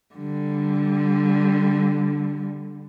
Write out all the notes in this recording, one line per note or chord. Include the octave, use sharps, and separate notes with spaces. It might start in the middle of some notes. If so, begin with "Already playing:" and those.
D3 G3